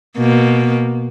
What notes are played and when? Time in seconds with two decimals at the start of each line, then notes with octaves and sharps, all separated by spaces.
0.17 B2 A#3